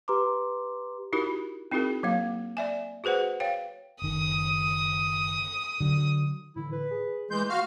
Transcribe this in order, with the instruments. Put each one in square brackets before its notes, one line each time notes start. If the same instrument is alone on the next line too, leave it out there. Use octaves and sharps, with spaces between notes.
[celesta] G4 B4 A#5 C6 D6
[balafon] D#4 E4 F#4 G4 A#4
C4 D#4 E4 F#4 G#4 A#4
F#3 A#3 F5
D5 E5 G#5
F#4 G#4 B4 C5 F#5
C#5 F5 G5
[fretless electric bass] F#1 D#3 [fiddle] D#6
[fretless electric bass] D3 F#3
[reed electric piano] A2 D3 E3 [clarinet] E4
[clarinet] B4
[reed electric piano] G#4
[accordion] E3 G#3 G6 [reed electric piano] A3 [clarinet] C6
[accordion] F#4 F5 F6